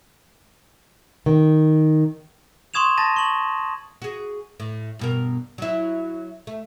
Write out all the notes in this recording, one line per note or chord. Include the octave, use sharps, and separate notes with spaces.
D#3
C6 C#6 D#6 G#6 E7 F7
A5 A6 A#6 D#7
C#6 F#7
F#4 G#4
A2
G2 B2 A#4
F#3 E4
A3